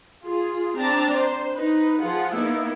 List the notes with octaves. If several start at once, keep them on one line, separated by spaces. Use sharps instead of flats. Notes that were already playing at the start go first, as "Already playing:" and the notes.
F4 G#4
C4 D4 A5 A#5
C5
D#4 B4
F3 F4 G#4 F#5
A#3 B3 D#4 E4